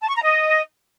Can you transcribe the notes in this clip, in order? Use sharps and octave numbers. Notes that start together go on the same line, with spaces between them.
A5
C#6
A#5
D#5